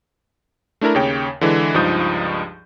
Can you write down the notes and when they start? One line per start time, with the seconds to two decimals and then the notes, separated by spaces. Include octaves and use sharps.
0.81 A3 D4 E4 A#4 A#5
0.95 D#2 C#3 C#5 G5
1.41 D3 E3 G#3
1.74 C#2 G2 F3 D#4 D#6 G6